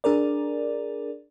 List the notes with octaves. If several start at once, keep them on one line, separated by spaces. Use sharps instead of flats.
D4 G#4 A#4 D5